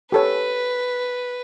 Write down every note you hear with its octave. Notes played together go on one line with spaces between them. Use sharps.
G4 A4 B4 C#5